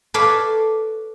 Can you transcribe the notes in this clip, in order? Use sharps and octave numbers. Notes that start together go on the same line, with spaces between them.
A4 B4 C#5 D5 F5